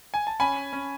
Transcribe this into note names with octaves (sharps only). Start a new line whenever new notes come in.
G#5
A5
C#4 G#5 B5
C#4